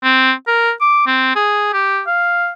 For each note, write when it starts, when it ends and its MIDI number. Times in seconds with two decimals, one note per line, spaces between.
0.04 0.32 60
0.47 0.71 70
0.81 1.02 86
1.07 1.31 60
1.36 1.70 68
1.73 2.01 67
2.07 2.50 77